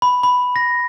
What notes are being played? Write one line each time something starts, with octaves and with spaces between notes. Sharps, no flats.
B5
B5
A#6